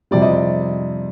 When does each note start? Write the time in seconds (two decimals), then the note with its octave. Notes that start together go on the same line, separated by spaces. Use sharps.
0.11 F2 C3 G3 D5
0.22 D#5
0.33 D5